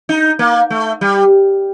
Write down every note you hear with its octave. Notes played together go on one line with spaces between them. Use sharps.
D#4
A#3
A3
G3